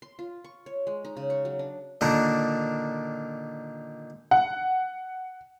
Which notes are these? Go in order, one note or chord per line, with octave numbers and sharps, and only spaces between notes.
C6
F4
C#6
C#5
G#3
D#4
C#3
C#6
F#3
D4
A#2 D3 D#3 D4 A#4
F#5